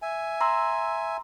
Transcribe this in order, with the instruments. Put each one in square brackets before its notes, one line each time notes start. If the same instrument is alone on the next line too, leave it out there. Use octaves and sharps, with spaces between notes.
[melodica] E5 G#5
[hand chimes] A#5 C6 E6